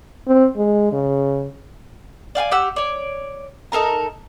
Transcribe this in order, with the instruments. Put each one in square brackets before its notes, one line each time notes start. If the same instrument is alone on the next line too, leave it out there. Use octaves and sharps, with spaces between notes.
[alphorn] C4
G#3
C#3
[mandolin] D5 F5 G5 G#5
G4 F#5 E6
C#5 D5
D#4 A4 A#4 A#5